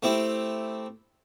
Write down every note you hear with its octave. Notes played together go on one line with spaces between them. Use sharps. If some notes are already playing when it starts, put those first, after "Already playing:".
A3 C4 E4 G4